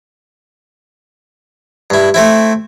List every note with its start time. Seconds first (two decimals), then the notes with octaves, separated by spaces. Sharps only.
1.90 G2 E4
2.14 A3 C4 E4